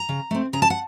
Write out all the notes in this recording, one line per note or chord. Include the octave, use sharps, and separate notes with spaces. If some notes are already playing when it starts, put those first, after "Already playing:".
Already playing: A#5
C#3
A3 C4
C#3 A#5
A5
F#5